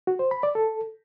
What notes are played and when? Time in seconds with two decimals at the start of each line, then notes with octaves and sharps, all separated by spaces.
0.07 F#4
0.19 C5
0.31 B5
0.43 D5
0.55 A4